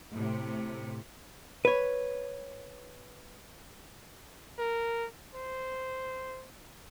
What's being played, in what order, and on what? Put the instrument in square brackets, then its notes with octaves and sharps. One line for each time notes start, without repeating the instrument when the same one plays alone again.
[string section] A2 C3
[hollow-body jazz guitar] B4 C#5
[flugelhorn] A#4
C5